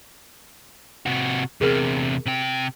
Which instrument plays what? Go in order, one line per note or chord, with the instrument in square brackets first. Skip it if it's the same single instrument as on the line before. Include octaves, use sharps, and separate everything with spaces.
[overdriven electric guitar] C3 F#4
[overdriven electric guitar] E2 C3 [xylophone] G#4 A#4 F6
[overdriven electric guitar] C3 G5